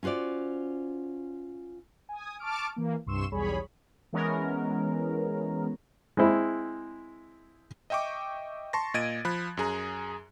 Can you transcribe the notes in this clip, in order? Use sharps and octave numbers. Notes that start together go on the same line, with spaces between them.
C#4 F4 F#4 C5 D5
G#5 D#6
A5 C#6 D6 F6 D7
E3 A#3
C2 G2 C6 C#6 E6 E7
B1 E2 G3 G#4 C#5 B5
E3 G#3 B3 C#4 A#4
G#3 C4 E4
D#5 E5 G5 C#6 D6
A5 C6 C#6 A6 A#6
A#2 D#5 G#6 A6 D7 D#7
F3 B5 F#6
F#2 G#4 A#5